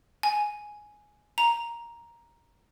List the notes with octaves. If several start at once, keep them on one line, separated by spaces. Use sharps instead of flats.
G#5
A#5